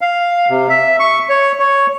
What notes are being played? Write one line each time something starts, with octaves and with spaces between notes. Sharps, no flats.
F5
C3
E5
C#6
C#5
C#5